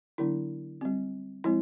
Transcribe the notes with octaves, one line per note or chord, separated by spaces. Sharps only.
D3 F#3 B3 D4 E4
G3 C4
F3 G#3 C4 E4